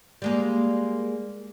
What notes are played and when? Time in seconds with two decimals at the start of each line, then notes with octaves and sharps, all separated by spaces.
0.22 G3 G#3 A#3